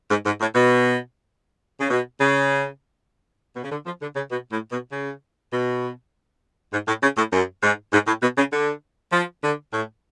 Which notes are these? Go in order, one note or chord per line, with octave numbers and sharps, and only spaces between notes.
G#2
G#2
A2
B2
C#3
B2
C#3
B2
C#3
D3
F3
D3
C#3
B2
A2
B2
C#3
B2
G#2
A2
C#3
A2
F#2
G#2
G#2
A2
B2
C#3
D3
F3
D3
A2